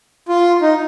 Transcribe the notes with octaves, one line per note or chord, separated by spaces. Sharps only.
F4
D#4